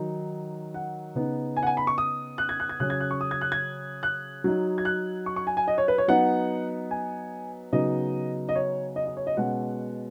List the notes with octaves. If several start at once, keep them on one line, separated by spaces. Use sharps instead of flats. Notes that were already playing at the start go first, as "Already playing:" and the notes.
Already playing: D#3 F#3 D#4
F#5
C#3 B3 D#4
G#5
F#5
G#5
B5
C#6
D#6
F#6
G#6
F#6
G#6
C#3 F#3 C#4 F#6
G#6
F#6
C#6
D#6
G#6
F#6
G#6
F#6
F#3 D#4
G#6
F#6
C#6
C#6
G#5
G#5
D#5
C#5
B4
C#5
F#3 B3 D#4 F#5
G#5
C#3 F#3 B3 D#4 D#5
D#5
C#5
D#5
D#5
C#5
D#5
B2 G#3 C#4 F#5